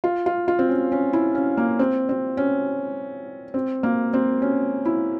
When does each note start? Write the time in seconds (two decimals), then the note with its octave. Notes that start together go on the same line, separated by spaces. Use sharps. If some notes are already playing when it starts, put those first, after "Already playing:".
0.04 F4
0.26 F4
0.48 F4
0.59 C4
0.69 C#4
0.92 C#4
1.13 E4
1.35 C#4
1.57 A#3
1.79 C4
2.09 C4
2.37 C#4
3.54 C4
3.83 A#3
4.14 C4
4.42 C#4
4.86 E4